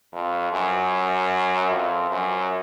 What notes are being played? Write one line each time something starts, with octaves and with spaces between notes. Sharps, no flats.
F2
F#2
F2
F#2